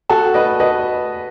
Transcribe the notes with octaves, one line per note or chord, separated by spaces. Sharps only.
F#4 A4
B4 D#5
B4 D#5